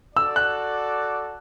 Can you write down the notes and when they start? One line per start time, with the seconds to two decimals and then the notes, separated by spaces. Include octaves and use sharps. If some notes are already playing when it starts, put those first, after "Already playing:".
0.16 F#4 A4 D5 E6
0.36 F#6